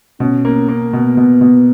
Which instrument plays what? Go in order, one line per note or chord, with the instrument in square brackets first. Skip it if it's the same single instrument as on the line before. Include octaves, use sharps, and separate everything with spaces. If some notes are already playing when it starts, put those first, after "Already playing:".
[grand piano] B2 [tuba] C#4
[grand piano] A#3
A#3
[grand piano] B2 [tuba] B3
[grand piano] B2
B2